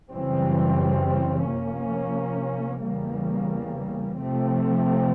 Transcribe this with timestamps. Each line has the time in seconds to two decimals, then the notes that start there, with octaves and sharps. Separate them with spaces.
0.12 F#2 C#3 E3 G3 C4
1.47 C3 F3 A#3 C#4
2.85 E2 C#3 E3 G3 A#3
4.21 C3 F3 A3 C4